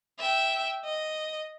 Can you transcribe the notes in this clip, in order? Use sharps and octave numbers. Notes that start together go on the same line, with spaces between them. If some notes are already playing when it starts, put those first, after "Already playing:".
E5 G5
D#5